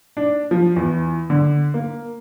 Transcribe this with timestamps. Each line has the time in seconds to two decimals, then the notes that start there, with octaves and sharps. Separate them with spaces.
0.17 D4
0.51 F3
0.76 E2
1.30 D3
1.74 A#3